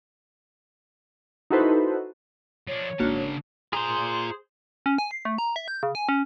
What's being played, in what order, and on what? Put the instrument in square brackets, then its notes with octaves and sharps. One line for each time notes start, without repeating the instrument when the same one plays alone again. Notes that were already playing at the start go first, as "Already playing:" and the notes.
[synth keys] D#4 E4 F#4 A4 B4 C5
[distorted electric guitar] F3 D4 [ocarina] C#5
[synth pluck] G#1 A#3 F#4 [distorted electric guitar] C#3 A5 [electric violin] D4
[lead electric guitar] F4 A#5 [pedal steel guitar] G#4 C5
[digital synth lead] C#4
G#5
C7
A3
A#5
E5
G6
C#3
G#5
C#4